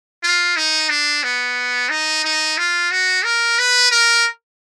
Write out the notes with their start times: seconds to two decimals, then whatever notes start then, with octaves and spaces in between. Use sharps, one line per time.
0.23 F4
0.56 D#4
0.89 D4
1.23 B3
1.90 D#4
2.24 D#4
2.57 F4
2.91 F#4
3.24 A#4
3.58 B4
3.91 A#4